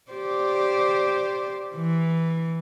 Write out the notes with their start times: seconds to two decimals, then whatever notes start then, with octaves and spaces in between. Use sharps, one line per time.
0.11 G4 C5 D5
1.76 E3